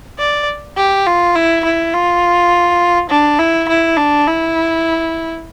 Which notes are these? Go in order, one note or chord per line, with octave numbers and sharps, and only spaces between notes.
D5
G4
F4
E4
E4
F4
D4
E4
E4
D4
E4